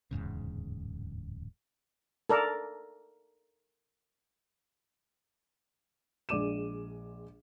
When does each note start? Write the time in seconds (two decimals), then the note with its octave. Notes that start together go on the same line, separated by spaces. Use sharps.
0.11 D1 E2 G#2 C#3
2.29 A4 A#4 D5
6.29 A#1 G#3 D5 D6 D#7 E7